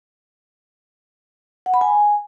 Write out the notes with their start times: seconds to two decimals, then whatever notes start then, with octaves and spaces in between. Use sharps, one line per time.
1.66 F#5
1.74 B5
1.81 G#5